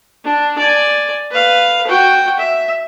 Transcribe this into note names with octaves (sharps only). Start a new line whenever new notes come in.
D4
D5 G#5
B4 F5
F#4 G5
E5